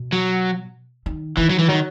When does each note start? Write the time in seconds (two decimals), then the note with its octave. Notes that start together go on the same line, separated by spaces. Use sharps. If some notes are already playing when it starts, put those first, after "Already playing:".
Already playing: B2
0.12 F#3
1.06 D#3
1.37 D#3 E3
1.50 F#3
1.59 E3
1.68 D#3 F#3